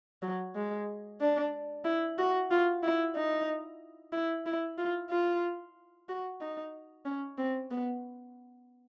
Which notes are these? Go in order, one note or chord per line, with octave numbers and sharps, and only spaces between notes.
F#3
G#3
D4
E4
F#4
F4
E4
D#4
E4
E4
F4
F4
F#4
D#4
C#4
C4
B3